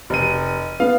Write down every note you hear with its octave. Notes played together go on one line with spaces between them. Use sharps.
F1 D#7
B3 F5